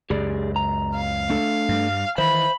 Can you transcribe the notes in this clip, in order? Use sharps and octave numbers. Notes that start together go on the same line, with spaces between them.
C#2 F#2 G4 G#4 D5
A#5
F5
A3 D4 A4
G2 G3
D#3 E3 C5 E5 B5